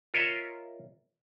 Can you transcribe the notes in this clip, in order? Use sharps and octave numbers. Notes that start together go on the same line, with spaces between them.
F4 A#4 C#5 D#5 E5